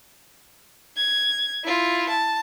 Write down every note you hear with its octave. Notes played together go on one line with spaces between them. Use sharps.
G#6
E4 F4
A5